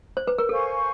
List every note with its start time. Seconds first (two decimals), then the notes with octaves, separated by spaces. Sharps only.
0.17 C5
0.27 B4
0.38 A#4
0.49 A4 C5 F5 G#5 C#6